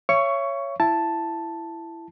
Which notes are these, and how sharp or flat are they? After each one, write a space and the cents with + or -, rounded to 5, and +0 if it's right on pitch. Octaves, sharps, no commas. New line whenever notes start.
C#5 +0 E5 +40 C#6 +10
E4 +15 A5 +0